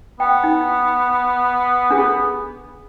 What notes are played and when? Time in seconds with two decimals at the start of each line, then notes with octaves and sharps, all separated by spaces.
0.20 B3 G5
0.44 D#4
1.90 D4 G#4